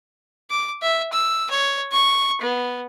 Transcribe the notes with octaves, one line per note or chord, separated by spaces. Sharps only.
D6
E5
E6
C#5
C#6
B3